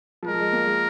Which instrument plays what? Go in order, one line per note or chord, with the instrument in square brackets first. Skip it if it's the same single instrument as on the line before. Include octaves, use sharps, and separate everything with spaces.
[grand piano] F3
[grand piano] G#3 [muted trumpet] A#4
[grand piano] F3
G#3
A#3
G#3